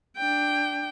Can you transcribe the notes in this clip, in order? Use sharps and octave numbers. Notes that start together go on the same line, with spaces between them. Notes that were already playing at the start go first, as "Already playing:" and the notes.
D4 G5